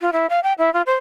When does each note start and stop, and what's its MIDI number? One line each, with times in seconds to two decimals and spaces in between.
0.01 0.10 65
0.13 0.27 64
0.30 0.40 77
0.43 0.53 79
0.58 0.72 64
0.73 0.82 65
0.86 0.94 72